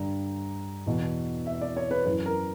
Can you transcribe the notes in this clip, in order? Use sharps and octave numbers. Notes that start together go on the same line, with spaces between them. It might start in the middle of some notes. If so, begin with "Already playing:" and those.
Already playing: G2 D3 A#5
E2 B2
E5
D5
C#5
B4
F#2 E3 B4
A#4